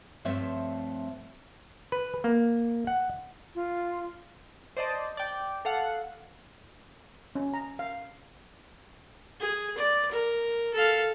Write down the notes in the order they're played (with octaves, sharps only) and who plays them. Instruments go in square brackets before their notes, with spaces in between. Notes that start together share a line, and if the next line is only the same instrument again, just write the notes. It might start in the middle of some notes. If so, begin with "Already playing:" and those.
[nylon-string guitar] G2 F3 A3 C4 C#5 E5
[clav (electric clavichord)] B4
A#3
F#5
[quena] F4
[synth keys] C5 D5 D#5 A5
D5 G5
A4 F5 F#5
[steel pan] C#4
A#5
F5
[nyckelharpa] G#4
D5
A#4
A4 F5